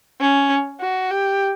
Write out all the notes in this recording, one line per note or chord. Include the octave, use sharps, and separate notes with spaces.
C#4
F#4
G4